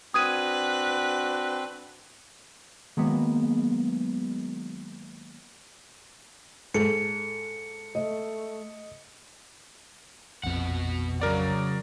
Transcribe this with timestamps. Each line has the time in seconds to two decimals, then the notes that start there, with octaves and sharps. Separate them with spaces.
0.14 C4 D4 F#4 B4 D#6 G#6 D#7
2.97 D#3 F#3 G#3 A#3 B3
6.74 G#2 A4 C#7
7.95 A3 D#5
10.43 A#1 F2 B2 F#5
11.21 C#3 F#3 A#4 D5